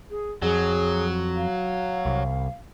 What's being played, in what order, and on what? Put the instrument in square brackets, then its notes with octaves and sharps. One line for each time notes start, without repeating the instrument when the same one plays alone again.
[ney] G#4
[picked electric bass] F2 [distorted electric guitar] F#3 [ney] G#4
[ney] F5
[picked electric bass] C2